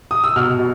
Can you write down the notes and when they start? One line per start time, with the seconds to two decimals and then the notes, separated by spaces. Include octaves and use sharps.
0.11 D#6
0.24 E6
0.36 B2 F6
0.59 B2